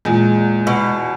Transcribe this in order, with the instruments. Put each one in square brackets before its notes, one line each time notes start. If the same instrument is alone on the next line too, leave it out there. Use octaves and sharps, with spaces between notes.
[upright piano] E2 [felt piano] A#2 [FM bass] G#3
[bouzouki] B2